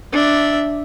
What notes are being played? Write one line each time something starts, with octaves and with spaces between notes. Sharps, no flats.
D4 E5